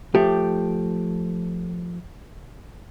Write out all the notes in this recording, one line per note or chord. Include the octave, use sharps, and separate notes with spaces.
F3 A3 G4